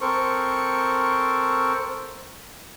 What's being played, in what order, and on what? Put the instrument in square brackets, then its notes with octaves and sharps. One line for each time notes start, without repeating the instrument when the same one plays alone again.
[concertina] C4 A4 A#4 C5 C#6